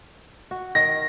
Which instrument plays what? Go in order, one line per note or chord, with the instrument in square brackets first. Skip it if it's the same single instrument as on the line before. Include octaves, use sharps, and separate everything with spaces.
[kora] F#4
[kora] D#3 [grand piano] A#6